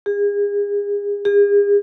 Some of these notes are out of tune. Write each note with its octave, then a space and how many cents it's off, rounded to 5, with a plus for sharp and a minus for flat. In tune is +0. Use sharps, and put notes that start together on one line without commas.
G#4 -35
G#4 -40